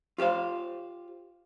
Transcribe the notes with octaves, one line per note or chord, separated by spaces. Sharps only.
F4 G4 C5 F5